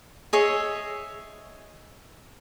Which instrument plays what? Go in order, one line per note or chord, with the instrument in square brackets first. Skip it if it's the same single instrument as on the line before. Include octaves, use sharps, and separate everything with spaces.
[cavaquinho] G#4 C#5 D#5 E5